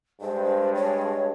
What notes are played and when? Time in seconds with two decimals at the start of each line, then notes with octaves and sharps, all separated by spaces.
0.21 G2 G#3 C5
0.75 C#5